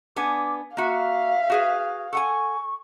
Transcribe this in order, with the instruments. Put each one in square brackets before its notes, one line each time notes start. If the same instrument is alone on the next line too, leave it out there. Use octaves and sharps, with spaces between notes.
[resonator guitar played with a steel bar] B3 D4 G#5 [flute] D6
[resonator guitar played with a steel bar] A#3 F#4 [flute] E5 [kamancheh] F5
[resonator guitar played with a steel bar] F#4 G#4 B4
[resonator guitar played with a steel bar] A4 F#5 G#5 [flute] C#6